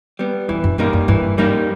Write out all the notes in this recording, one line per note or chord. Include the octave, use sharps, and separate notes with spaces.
G3 B3
F2 E3
F#2
G2 G3 A#3 D#4
F#2
G2 E3
G3 A#3 D#4